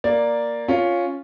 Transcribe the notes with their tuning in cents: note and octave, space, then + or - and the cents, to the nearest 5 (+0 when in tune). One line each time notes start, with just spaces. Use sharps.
A#3 +0 D5 +0
C#4 +0 F4 +5